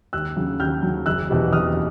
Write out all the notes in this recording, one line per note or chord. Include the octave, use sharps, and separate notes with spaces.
D#2 E6 F#6
C#3 F#3
D#2 F6 G6
C#3 F#3
F#1 E6 F#6
E2 B2 G3
F#1 D#6 F6